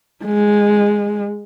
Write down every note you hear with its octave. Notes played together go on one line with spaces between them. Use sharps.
G#3